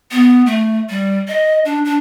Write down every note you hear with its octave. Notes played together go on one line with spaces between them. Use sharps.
B3
A3
G3
D#5
D4
D4